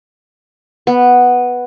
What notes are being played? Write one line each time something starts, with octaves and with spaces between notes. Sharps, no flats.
B3